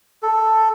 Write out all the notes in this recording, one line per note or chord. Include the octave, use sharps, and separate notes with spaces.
A4